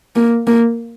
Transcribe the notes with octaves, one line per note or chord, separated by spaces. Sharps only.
A#3
A#3